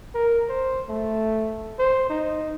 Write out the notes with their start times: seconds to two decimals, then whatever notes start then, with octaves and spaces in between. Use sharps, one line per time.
0.14 A#4
0.49 C5
0.89 A3
1.79 C5
2.10 D#4